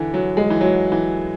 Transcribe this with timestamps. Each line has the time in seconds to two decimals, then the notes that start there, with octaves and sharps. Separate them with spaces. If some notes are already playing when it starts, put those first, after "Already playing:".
Already playing: D3 E3
0.14 F#3
0.37 G#3
0.50 E3
0.61 F#3
0.92 E3